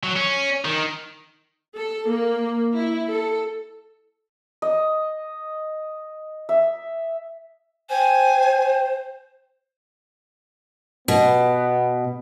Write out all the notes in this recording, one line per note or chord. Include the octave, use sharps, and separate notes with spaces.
F#3
C#4
D#3
A4
A#3
E4
A4
D#5
E5
C5 G5 G#5
B2 B3